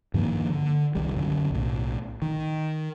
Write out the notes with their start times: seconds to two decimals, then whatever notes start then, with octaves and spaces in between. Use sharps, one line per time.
0.14 G2 D#3 F3 A#3
0.50 D3
0.95 C2 D#3 G3
1.16 F#2 D3
1.50 B1 A2
2.22 D#3